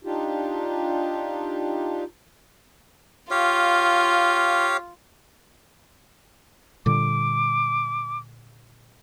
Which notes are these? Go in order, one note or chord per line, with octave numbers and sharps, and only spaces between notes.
D4 D#4 F4 G4
F4 G4 C#5 F5
A#2 D3 G3 D6